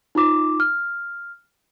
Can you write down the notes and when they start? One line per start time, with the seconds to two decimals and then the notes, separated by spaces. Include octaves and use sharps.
0.15 D#4 F4 D6
0.60 F6